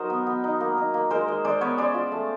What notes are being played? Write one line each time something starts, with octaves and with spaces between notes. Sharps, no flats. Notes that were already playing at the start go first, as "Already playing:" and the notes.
Already playing: F#3 D#4 A#4 C5 D#5
B3
B3
D#4
A#3
D#4
A#3
G#3 A#4 C5
G#3
G#3 C5 D5
B3 B4 C#5
C#4 C5 D5
F4
A3